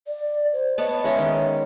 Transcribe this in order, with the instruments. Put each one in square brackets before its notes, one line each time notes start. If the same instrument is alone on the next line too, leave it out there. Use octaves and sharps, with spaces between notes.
[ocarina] D5
C5
[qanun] B3 C#5 A5 [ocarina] D#5
[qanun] G#3 C#4 C#6 [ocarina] E5
[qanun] D#3